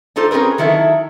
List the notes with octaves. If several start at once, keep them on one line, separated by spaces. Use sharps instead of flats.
D4 D#4 F4 A4 C5
C4 C#4 G#4 A#4 B4
D#3 F#3 E4 A4 E5